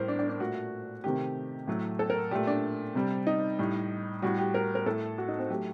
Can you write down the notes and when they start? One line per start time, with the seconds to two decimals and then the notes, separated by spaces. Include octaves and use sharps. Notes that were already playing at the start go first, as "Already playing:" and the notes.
Already playing: A2 G3 A#4 C5
0.08 D4
0.19 D4
0.29 D4
0.40 A#2 A3 F#4
1.04 C3 D#3 A3 G4
1.67 A2 F#3 A3
1.99 A4
2.10 A#4
2.31 A#2 A3 G4
2.47 D4
2.95 C3 G3
3.27 D#4
3.59 A2 G3
4.22 A2 G3 F#4
4.38 G4
4.54 A#4
4.75 A#4
4.86 A2 A3 A4
5.18 F#4
5.28 D#4
5.39 C4
5.50 F#3 A3 G4